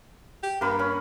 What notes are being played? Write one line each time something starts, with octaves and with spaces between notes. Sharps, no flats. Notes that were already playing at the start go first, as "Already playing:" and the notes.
G4
G2 A#3 B4 B5
C#4